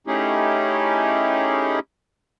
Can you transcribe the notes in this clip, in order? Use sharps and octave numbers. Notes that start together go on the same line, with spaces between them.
A3 C#4 D#4 E4 G4 G#4